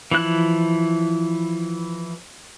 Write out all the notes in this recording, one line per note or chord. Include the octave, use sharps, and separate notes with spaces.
E3 F3 E4 F#6